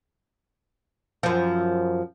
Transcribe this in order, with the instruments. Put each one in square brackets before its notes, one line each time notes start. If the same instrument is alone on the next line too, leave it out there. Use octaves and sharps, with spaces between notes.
[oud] F#2 F3